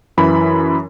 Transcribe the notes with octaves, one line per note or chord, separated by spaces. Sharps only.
F#2 E3 B5